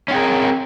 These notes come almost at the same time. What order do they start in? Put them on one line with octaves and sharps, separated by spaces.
C#4 C4 G#4 A#4